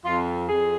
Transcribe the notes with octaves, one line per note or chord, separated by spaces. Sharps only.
F2 F4
F2 G#4